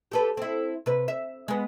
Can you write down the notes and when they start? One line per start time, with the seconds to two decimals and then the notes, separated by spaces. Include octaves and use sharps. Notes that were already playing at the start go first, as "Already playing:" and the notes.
0.11 G4 A4 B4
0.37 C4 E4
0.86 C3 B4
1.08 E5
1.48 G#3 B3